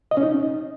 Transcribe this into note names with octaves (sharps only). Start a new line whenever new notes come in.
D#5
C#4
D#4